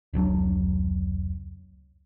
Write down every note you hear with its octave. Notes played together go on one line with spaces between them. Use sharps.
F1 C#2 F#3 D4